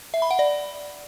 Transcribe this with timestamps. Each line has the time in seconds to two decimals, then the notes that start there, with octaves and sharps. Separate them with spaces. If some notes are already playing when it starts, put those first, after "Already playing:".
0.14 E5
0.22 B5
0.31 F#5
0.39 D5